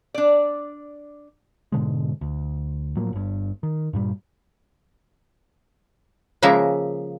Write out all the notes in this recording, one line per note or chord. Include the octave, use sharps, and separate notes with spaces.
D4 D5
G#2 B2 D3 G#3
D2
A2 F3 F#3 A#3
G1 G2
D#3
G2 A#2 G3
C#3 F3 G#3 A#3 E5